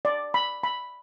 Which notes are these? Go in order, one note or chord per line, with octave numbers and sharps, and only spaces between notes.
D5
B5
B5